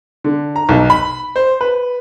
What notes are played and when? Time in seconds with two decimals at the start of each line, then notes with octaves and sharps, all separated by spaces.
0.24 D3
0.56 A#5
0.69 B1
0.90 B5
1.36 C5
1.61 B4